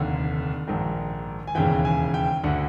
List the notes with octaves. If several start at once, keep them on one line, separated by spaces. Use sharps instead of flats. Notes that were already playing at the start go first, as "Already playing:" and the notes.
Already playing: F1 D#2 D3 F#5
A#1 G#2 D#3
G#5
E1 D#2 C#3 E3 G5
G#5
G5
D2 D3 F#5